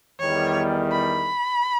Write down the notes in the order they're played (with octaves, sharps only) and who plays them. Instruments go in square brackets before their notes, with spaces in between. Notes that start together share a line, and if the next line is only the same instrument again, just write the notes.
[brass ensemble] E2 D#3 G3 [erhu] C#5
[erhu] B5